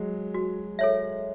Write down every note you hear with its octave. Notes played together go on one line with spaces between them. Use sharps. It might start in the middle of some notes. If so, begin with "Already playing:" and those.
Already playing: F#3 G#3
F#4
A4 C#5 E5